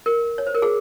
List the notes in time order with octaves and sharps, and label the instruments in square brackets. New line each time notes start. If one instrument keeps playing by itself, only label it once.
[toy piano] A#4
C#5
C5
A#4
G#4